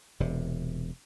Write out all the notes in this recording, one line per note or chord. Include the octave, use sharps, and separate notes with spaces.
E1 C3